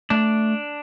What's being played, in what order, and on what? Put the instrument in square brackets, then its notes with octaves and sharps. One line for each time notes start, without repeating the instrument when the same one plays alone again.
[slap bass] A3 [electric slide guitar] D4